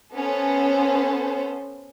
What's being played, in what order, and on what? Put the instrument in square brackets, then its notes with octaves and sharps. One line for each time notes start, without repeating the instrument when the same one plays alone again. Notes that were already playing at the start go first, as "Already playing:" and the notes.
[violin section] B3 C#4 A4 C5